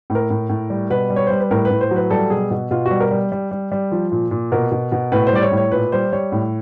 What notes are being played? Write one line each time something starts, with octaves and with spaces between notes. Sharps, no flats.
A2
A#4
A2
A2
G3
B2 B4
G3
C#5
G3 C5
B4
A2 A#4
B4
A2
C5
F#3
B4
G3 A4
B2 G#4
B2
B2 F4
F#4
G3
A#4
G3
G3
G3
G3
F3
A#2
A#2
B2 A#4
B2
B2
A2 B4
C5
G3 D5
C#5
A2
C#5
A#2 B4
G3 C5
G3 C#5
A2